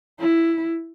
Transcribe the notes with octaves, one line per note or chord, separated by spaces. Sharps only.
E4